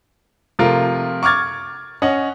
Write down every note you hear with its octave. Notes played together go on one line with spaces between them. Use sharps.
C3 F3 A3 F4 A#4
C#6 D6 F6 G#6 A6
C#4 D#5 F#5